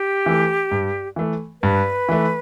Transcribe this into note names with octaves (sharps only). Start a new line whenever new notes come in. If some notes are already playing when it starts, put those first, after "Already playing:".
Already playing: G4
E3 A3
G2
E3 A3
G2 B4
E3 A3